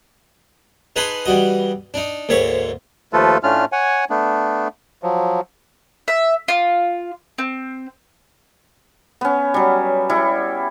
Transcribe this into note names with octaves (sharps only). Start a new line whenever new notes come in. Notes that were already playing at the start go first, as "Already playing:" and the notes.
D#4 G#4 B4 A5 B5 C6
E3 G3 F#4 D#5
D4 D#4
D2 G#2 A#3 C#5 E5 C#6
D#2 F3 A3 F4 A4 B4
A2 A3 C#4 D4 F4 F6
C#5 F#5 G#5
A3 B3 D4
F3 F#3
E5
F4
C4
B3 C#4
F#3 G3
G3 E4